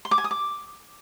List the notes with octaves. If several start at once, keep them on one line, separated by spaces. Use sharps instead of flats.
C6
D6
G#5
D#6
D6